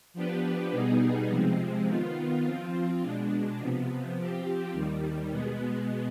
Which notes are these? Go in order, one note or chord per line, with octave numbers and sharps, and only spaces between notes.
F3 B3 D4 G4 B4
B2 G3 B3 D#4 G#4
C3 F3 G#3 C4
D#3 B3 F4
F3 C4 F4
B2 G#3 D4
C3 F3 B3
F3 C4 G4
D#2 D#3 G3
B2 G#3 B3